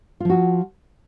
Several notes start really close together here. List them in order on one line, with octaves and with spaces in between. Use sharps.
F4 F3 F#4